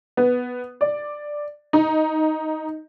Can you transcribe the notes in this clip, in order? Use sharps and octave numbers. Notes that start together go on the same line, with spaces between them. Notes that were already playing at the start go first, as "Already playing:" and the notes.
B3
D5
D#4